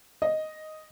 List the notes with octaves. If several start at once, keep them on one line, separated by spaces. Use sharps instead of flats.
D#5